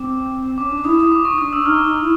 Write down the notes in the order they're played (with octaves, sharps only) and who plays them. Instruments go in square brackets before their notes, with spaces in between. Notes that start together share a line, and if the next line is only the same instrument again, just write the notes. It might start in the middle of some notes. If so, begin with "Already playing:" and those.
Already playing: [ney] C4 [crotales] D6
[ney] C#4 [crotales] D6
[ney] D4
[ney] E4 [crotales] D#6
[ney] E4 [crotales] D#6
[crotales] D6
C#6
[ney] D#4
[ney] D4 [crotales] D#6
[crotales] E6
[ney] D4
[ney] D#4 [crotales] F6
[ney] D#4
E4